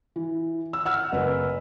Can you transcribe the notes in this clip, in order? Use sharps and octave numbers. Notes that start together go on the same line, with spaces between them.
E3
E6
F#5 E6 F6
F#1 B4